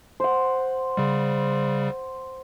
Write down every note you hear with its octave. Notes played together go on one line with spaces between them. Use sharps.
C5 F#5
C#3 G3